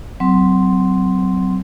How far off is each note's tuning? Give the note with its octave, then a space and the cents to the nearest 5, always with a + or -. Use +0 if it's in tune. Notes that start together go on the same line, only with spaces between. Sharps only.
F#3 +20 C4 -20 C6 +0